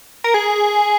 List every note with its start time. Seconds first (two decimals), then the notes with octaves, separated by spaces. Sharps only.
0.24 A#4
0.34 G#4